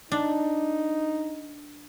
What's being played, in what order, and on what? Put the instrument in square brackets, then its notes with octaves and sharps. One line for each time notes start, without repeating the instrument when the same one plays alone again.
[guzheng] D4 [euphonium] D#4